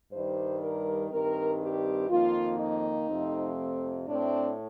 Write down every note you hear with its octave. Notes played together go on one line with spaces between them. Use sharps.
G2 D#3 G3 C5
A#4
G2 D#3 G3 C4 A#4
G4
F2 D#3 A#3 F4
D#4
F2 C3 F3 A3 C4
A2 A3 C4 D4